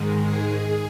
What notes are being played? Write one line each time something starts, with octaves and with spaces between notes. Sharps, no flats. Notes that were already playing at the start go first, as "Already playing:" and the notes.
Already playing: G#2 D#3 G#3
G#4